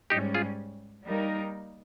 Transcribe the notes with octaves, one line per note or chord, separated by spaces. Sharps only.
G#2 G3 C#4 D#4 G4
F4 G#4
G3 A#3 D#4 A#4